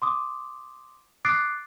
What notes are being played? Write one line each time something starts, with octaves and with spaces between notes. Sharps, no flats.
C6 D6 D#6
D6 D#6 F#6 A6 C7 D7